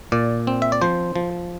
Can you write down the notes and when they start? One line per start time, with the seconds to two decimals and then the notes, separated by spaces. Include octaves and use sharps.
0.12 A#2 D5
0.47 C4
0.62 E5
0.72 D5
0.82 F3 C5
1.16 F3